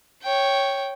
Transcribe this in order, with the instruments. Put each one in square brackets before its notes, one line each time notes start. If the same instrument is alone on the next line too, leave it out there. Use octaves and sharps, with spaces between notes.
[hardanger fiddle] C#5 G5